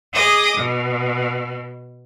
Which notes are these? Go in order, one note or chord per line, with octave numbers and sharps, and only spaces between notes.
G#4 D#5 D6
B2